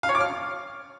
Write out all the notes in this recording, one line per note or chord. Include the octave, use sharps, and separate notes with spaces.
F5
C#5
D6
F6